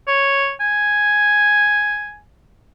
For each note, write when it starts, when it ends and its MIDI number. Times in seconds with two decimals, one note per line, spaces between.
0.07 0.52 73
0.60 2.19 80